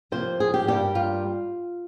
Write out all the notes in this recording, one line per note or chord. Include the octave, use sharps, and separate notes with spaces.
C3 F3 A#3 C5
G#4
G4
G2 G3 A#3 G4
F4